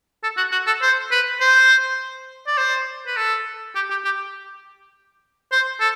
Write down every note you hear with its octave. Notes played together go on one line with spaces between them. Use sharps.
A4
F#4
F#4
A4
C5
B4
C5
D5
C5
B4
A4
G4
G4
G4
C5
A4